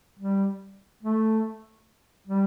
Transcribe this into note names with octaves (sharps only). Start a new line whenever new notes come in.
G3
A3
G3